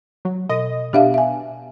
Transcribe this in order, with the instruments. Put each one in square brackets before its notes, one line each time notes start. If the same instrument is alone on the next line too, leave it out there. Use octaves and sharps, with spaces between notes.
[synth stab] F#3
[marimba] B2 [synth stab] D#5
[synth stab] B2 B3 D4 [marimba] G4 E5 F5
[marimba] E5 G#5